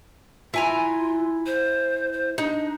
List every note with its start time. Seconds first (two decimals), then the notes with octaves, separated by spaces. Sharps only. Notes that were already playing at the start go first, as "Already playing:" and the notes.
0.54 E4 F4 G#5 A#5
1.46 C5
2.12 C5
2.38 D4 D#4